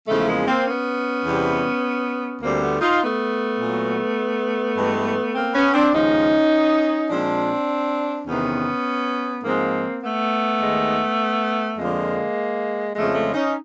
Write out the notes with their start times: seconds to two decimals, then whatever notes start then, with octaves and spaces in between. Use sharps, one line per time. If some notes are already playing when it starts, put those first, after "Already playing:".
0.08 E2 C#3 F3 G#3 A3
0.28 G#3 A#3
0.47 A#3 C4
0.67 B3 C#4
1.25 E2 C3 E3 G3
2.42 D2 D3 G3 A#3 C4
2.62 A3 B3
2.81 D#4 F4
3.01 A3 B3
3.60 A#2 F#3
4.77 G2 E3 G#3
5.34 A#3 C4
5.54 B3 C#4
5.74 C4 D4
5.93 D#2 C#3 F3 G#3 C#4 D#4
7.10 A#2 F3 G#3 C4 D4
8.27 E2 C3 D#3 B3 C#4
9.44 G#2 F3 G#3 A#3 C4
10.03 A3 B3
10.61 D#2 D#3 G#3
11.78 F2 D3 F3 G#3 A#3
12.95 F2 C#3 F3 G#3 A3
13.15 A3
13.34 C#4 D#4